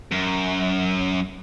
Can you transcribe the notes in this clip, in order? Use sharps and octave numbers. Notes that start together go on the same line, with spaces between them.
F#2